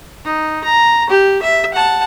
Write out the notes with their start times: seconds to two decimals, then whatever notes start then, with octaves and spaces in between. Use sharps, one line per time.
0.25 D#4
0.64 A#5
1.10 G4
1.42 E5
1.74 F#5 A5